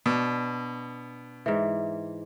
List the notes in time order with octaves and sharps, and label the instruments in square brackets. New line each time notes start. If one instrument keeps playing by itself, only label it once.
[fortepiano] B2 [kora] D4
[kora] G#2 E3